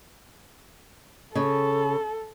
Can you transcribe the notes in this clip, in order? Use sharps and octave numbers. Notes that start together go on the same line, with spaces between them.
C#3 A4